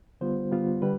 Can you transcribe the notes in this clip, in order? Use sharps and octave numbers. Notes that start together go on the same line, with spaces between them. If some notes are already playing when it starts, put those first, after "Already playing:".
D3 G3 B3 F4 C5
D3 G3 B3 F4
D3 G3 B4